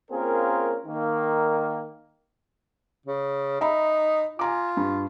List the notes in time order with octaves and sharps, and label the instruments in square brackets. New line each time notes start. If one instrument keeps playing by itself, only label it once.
[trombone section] A#3 C4 C#4 F4 G#4 A#4
D#3 A#3
[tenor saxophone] C#3
[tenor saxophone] D#4 [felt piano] E5 A#5 B5
[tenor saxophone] F4 [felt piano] G#5 A#5 D6
[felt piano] G2